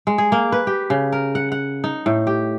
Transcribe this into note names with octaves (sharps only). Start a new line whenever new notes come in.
G#3
G#4
A#3
B4
G4
C#3
A#4
F#5
F#5
D#4
A2
G4